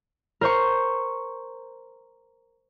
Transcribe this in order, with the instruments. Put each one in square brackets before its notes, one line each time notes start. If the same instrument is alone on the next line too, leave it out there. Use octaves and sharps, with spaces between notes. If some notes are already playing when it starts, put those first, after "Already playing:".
[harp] A#4 C5 C#6